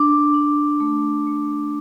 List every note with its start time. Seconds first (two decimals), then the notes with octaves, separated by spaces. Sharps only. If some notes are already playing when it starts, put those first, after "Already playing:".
Already playing: D4 D6
0.34 D4
0.80 A3
1.27 A3